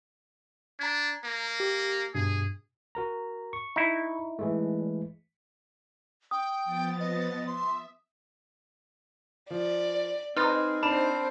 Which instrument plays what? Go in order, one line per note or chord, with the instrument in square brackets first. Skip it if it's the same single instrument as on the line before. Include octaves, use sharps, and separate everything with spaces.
[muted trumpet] D4 [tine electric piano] A#5 G#6
[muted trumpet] A#3
[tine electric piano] G4
[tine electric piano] G2 B2 [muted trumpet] G#4
[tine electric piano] F#4 A#4 A#5
C#6
[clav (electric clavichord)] D#4 E4
[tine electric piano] E3 G#3 A3
[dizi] G5 [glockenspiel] D#6
[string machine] F3 B3 A6
[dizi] D#5
[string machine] E5 [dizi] C6
[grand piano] F3 [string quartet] D5
[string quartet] C4 G#4 [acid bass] D#4 [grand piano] B4 C6 A6 [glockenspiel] F6
[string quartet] C4 C5 [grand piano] D4 E7 [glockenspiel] A5 B5